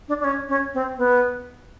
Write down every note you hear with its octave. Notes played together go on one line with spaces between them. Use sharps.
D4
D4
C#4
C#4
C4
B3